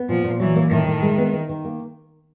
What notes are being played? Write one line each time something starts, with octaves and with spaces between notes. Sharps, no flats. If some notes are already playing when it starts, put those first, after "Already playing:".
Already playing: B3
A#2 F3
A#2
E3 F#3
A#3
A2 D#3
A2
G#3
B3
D#4
D#3
A#3